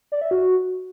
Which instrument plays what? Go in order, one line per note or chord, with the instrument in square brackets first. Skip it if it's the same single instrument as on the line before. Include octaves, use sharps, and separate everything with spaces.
[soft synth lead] D5
E5
F#4